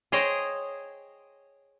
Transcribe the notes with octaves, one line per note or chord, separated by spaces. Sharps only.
G#4 C5 C#5 D#5 G5